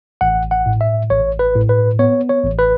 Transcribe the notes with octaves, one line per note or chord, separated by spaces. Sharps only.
A1 F#5
F#5
A2
E5
A1 C#5
B4
A2
B4
B3 C#5
C#5
A1
B4